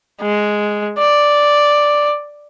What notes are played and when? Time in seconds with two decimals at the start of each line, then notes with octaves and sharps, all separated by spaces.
0.22 G#3
0.99 D5